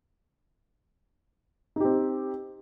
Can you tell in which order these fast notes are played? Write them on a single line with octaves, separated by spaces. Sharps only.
D#4 G4 C4